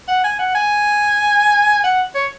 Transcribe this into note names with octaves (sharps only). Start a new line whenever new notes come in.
F#5
G#5
F#5
G#5
F#5
C#5